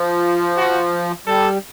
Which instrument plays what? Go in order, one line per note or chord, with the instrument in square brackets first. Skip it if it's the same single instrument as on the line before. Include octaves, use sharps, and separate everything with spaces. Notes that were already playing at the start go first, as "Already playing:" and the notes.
Already playing: [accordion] F3
[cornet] F#4
[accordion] G3 [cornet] A4